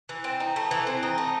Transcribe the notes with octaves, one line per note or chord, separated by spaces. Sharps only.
E3
C4
D#4
A3
E3
C4
D#4
A3